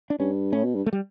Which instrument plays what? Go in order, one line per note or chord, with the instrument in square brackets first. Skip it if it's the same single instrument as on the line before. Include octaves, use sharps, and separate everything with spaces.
[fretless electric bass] D4
[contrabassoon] G2 [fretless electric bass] C#4
[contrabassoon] A2 [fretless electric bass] C#4
[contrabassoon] B2
G2
[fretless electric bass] A3
G3